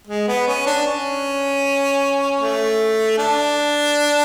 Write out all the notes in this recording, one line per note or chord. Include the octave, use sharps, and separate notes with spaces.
G#3
B3
C#4
D4
C#4
A3
D4